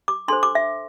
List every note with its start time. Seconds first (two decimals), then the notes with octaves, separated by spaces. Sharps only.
0.08 D6
0.28 D4 A4 C5 C6
0.43 D6
0.55 E5